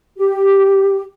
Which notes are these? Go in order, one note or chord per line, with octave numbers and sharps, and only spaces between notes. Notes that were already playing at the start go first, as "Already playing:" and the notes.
G4